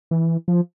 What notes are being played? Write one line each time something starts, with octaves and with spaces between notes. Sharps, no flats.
E3
F3